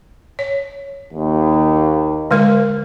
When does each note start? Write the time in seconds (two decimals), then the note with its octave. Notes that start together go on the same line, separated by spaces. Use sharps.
0.39 C#5
1.13 D#2
2.31 D3 G#3 A#4